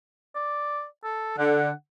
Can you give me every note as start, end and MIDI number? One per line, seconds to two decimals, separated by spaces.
0.35 0.85 74
1.04 1.34 69
1.38 1.69 50
1.38 1.71 78